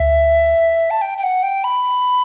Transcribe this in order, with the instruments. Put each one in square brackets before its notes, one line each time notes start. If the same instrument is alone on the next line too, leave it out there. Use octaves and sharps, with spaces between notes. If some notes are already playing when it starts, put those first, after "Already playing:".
Already playing: [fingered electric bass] D2 [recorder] E5
[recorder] A5
G5
G5
F#5
G5
B5